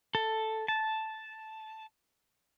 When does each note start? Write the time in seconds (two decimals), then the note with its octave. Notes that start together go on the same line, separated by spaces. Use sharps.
0.15 A4
0.68 A5